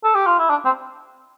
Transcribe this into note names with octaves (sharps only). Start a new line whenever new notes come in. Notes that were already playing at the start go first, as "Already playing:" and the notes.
A4
G4
F4
E4
D4
C4